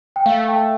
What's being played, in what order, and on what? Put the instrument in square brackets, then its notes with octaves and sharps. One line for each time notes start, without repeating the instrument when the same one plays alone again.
[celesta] G5
[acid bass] A3 [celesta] F5
[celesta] G5